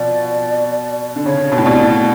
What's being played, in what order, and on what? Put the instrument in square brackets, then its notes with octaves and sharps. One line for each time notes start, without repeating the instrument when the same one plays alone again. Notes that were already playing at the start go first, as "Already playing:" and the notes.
Already playing: [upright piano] B2 F3 [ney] D5
[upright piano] D3
[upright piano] C#3 [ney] C#5
[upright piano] B2
A2
[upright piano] B2 [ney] D5
[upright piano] A2